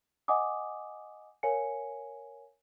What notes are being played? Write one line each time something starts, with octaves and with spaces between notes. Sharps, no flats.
D#5 F#5 G#5 D6 D#6
A#4 C#5 F5 G#5 C#7